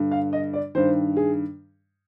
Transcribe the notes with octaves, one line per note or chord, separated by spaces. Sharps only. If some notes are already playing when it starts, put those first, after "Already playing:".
Already playing: G2 D3
F5
D#5
D5
G2 D#3 C5
G#4